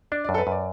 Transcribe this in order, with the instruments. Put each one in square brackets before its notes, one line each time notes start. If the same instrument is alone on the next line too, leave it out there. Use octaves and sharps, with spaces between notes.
[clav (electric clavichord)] D4 [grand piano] D5
[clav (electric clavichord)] F#2 [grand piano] D5
[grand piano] A4
B4
[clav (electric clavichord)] F#2 [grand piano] D5